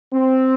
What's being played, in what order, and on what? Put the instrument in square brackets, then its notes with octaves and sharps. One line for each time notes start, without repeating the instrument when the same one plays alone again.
[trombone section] C4